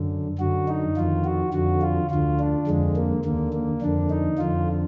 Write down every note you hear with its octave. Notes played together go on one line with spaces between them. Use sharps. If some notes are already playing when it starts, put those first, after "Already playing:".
Already playing: F#2 D3
F#2 D3 F#4
D#4
F2 D#3 F4
F#4
F2 D3 F#4
F4
D2 D3 F4
D4
F2 D3 G#3
A#3
D#2 D3 A#3
A#3
F2 D3 D4
D#4
F2 D3 F4